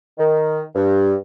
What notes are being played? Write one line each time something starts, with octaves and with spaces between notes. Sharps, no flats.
D#3
G2